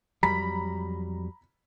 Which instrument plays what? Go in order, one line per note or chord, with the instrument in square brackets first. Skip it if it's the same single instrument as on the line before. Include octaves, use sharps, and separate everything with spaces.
[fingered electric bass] F2 F#3 G3 [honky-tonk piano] A#5 B5 B6